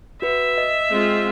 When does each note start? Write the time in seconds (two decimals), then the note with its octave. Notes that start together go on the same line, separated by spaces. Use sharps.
0.22 F#4 B4 E5
0.58 D#5
0.90 G#3 C4 F4